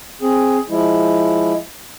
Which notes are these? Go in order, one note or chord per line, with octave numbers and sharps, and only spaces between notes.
C4 G#4
F3 G#3 E4